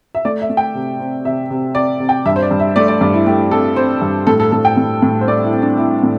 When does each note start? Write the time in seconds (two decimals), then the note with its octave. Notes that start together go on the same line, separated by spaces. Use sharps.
0.15 E5
0.25 A3 D5
0.42 E5
0.50 A3
0.57 G5
0.75 C3
1.00 C4
1.25 C3 E5
1.50 C3
1.75 C4 D5
2.00 C3
2.09 G5
2.26 G2 E5
2.36 C5
2.42 D5
2.51 G2
2.60 E5
2.76 A3 D5
2.88 D5
3.01 G2 D5
3.14 E4
3.26 A3 G4
3.51 C4 A4
3.76 C4 C5
4.02 G2
4.27 A2 A4
4.40 A4
4.52 A2 A4
4.65 G5
4.77 A2
5.02 A2
5.21 C5
5.27 A3 D5
5.45 E4
5.53 C4
5.62 D4
5.77 C4 E4
6.03 A2